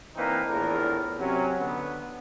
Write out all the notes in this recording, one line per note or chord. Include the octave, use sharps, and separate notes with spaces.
E3 A#3 C4 D4 D#4 B4
A#1 E2 A2 A#4
C3 F#3 C#4
D3 B3